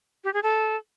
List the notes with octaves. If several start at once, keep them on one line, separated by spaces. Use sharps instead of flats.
G4
G#4
A4